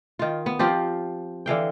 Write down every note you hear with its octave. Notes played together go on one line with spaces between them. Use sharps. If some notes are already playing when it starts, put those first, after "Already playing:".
D#3 F4
B3
F3 C4 F4 G4
D3 E3 F5 G5